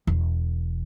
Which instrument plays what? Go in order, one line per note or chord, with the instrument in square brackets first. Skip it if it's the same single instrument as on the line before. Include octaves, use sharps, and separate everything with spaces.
[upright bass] E1